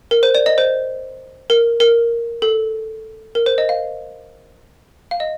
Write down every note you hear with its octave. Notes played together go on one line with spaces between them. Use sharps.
A#4
C5
D5
D#5
C5
A#4
A#4
A4
A#4
C5
D#5
F5
F5
D#5